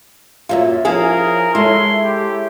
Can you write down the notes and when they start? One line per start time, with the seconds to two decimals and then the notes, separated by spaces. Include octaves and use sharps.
0.49 F#2 A#2 F#3 F4 E5
0.85 F3 C#4 E4 G#4 A#4 F5
1.55 G#3 E4 A4 C#5 C6
2.04 G4